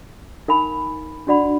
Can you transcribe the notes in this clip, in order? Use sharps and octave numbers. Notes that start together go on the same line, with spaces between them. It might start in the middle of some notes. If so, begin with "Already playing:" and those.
D#4 A#4 F5 G#5 B5
D4 F#4 D5 F#5 B5